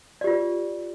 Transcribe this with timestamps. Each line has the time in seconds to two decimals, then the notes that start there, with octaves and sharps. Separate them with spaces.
0.21 D5
0.24 G4
0.27 F4
0.30 B4